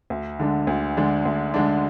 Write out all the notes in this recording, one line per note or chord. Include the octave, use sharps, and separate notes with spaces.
D2
D3 G#3 D4
D2
D3 G#3 D4
D2
D3 G#3 D4